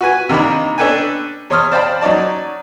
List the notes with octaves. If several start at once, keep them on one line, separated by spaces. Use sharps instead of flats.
F#4 B4 G#5
C3 D#3 A#3 D4 B5
C#4 D4 A4 B4 G5 G#5
E2 C#5 C6 D#6 F6
C5 D5 F5 G5 A5 B5
F#3 C#4 D#4 D5 A5